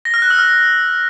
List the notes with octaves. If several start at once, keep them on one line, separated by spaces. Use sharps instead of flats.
A#6
F6
F#6
E6
F6